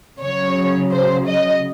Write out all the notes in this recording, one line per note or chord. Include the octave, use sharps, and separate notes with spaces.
C#3 F#3 C#5
C5
D#5